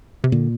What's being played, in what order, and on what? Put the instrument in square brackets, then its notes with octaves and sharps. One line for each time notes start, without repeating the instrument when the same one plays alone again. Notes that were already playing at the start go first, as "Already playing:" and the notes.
[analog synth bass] C3
[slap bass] A#2 [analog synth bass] D3